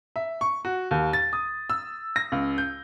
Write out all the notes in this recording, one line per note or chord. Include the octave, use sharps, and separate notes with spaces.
E5
C#6
F#4
D#2
A6
D#6
E6
A#6
C#2
G6